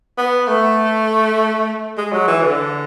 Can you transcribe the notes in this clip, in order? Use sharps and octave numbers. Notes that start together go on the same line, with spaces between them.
B3
A3
G#3
F#3
E3
D3